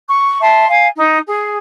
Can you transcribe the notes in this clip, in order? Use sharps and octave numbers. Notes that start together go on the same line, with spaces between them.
C#6
E5 A5 C6
F5 G#5
D#4
G#4